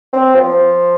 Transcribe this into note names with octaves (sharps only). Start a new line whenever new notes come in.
C4
F3